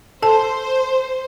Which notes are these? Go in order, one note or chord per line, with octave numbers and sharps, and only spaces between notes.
A4 C5 A5